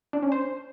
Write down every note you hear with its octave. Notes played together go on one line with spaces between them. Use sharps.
D4
C#4
C5